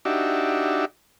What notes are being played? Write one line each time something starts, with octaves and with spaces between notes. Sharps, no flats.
D4 D#4 F#4 G4 E5